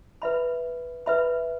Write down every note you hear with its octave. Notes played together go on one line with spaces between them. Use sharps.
B4 E5 B5
B4 E5 B5